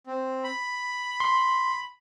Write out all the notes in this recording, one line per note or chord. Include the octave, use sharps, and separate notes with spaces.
C4
B5
C6